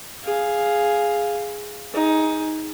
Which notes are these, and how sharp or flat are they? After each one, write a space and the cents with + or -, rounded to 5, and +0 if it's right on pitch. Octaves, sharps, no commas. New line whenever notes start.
G#4 +0 F5 +0
D#4 +15 G#4 +0